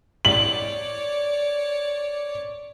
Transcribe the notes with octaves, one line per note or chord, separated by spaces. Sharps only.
C#5 D5 F#7